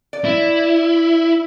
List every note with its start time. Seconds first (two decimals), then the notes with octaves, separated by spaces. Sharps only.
0.13 D5
0.25 E4